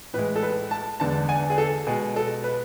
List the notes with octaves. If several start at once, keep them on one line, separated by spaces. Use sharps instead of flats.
A2 E3 G#3 B4
A4
B4
A5
E2 D3 G#3 A5
G#5
G#4
A4
B2 G#3 G#4
A4
B4